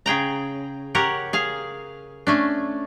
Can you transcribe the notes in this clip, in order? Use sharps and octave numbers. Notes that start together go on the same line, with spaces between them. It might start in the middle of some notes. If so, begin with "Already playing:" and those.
C#3 G#4 G5 A#5
G4 A#4 C#5 F#5
G#4 F5
A3 C#4 D4